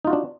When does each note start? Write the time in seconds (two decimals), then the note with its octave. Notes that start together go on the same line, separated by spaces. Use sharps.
0.05 D#4
0.07 F4
0.10 F#4
0.13 D4